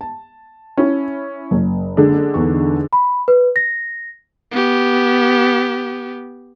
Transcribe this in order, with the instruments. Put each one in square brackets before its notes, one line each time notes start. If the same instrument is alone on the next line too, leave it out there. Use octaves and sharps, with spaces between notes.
[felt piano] A5
[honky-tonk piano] C#4 E4
[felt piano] F#1
[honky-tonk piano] D3 G#3 D4
[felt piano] E2 D#4 C#6
[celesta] B5
B4
A#6
[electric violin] B3 G4